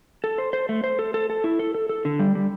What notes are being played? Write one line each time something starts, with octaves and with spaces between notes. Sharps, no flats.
A4
C5
C5
A3
C5
A4
A4
A4
E4
A4
A4
A4
D3
G3
G3